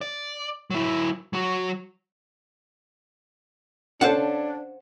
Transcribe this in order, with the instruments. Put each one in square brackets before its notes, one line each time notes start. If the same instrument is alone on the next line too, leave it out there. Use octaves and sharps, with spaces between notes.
[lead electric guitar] D5
F#3 E4
F#3 F#4
[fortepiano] C#4 A4 [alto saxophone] D4 [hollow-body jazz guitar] C5 F5 F#5